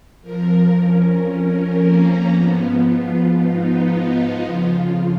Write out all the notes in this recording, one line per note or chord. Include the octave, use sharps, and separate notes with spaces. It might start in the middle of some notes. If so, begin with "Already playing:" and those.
F2 F3 A#4
C#4
C#4
A#3
G#2 F3 B3
F4
D#4
F4
F2 C#3 F3